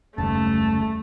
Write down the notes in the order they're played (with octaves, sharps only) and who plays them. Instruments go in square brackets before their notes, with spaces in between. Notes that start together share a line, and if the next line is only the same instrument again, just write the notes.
[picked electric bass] F#1 D#2 G3 [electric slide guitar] C#3 [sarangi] A3 [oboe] A5